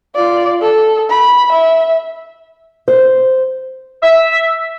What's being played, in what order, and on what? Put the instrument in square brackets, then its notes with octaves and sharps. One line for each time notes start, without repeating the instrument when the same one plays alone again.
[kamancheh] F4 D5
A4
B5
E5
[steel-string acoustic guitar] C5
[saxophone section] E5